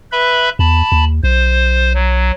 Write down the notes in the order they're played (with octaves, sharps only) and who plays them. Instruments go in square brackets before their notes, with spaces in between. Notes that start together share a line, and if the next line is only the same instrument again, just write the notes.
[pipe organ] B4 E5 B5
[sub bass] E2 [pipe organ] A5 B5
[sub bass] D#2
[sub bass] B1 [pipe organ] C5
[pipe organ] F#3